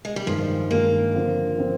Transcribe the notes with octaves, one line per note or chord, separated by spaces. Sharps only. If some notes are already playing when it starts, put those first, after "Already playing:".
G#3
G3
G2 D#3 F3 G#3
G2 D#3 G#3 A#3
D3 F3 C4
D3 F3 C4